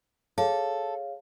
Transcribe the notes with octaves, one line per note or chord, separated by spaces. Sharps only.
G#4 A4 C#5 F5